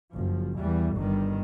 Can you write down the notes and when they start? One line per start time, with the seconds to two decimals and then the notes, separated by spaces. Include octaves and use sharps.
0.13 F#1 F3
0.58 E2 E3 G3
0.96 G1 G2 D#3 G3